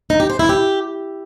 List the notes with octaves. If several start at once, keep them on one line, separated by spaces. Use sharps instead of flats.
D#4
G4
C5
E4
G4